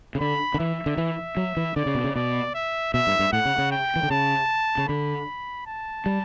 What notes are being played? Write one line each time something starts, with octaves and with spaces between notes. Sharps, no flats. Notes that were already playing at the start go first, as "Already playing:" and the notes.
C#3
D3 B5
D3
E3 E5
D3
E3
F#3
E3
D3 D5
C#3
B2
C#3
B2 D5
E5
B2 E5
G2
G2
A2 F#5
C#3
C#3
G5
E3
D3
C#3 A5
C#3
D3 B5
A5
G3